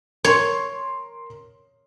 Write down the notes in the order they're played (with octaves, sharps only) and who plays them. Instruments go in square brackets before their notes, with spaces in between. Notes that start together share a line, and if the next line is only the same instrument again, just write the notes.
[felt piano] A#4 C6 [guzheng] C#5